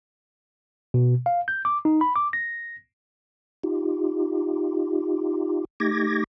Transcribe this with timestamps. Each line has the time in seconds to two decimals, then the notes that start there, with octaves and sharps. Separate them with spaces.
0.94 B2
1.26 F5
1.48 G6
1.65 D6
1.85 D#4
2.01 B5
2.16 D6
2.33 A#6
3.64 D#4 F4 G4
5.80 A3 D#4 G4 D6 G#6 A#6